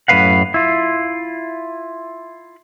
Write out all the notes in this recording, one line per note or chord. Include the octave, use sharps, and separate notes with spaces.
F#2 A2 A#3 B4 F5 F#5
E4 F4